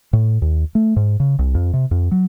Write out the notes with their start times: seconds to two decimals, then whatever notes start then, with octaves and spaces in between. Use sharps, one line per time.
0.13 A2
0.42 D#2
0.75 A3
0.96 G#2
1.20 C#3
1.39 C2
1.55 F2
1.73 C3
1.91 F2
2.11 F#3